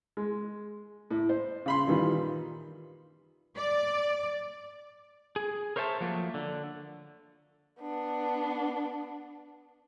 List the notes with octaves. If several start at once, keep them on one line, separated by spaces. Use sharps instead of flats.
G#3
A2
C5
C#3 B5 C6
A#2 D#3 E3 G3
D5
G#4
A#4 C5 C#5 E5 G#5 A5
F3 F#3 A3 A#3
D3
B3 D4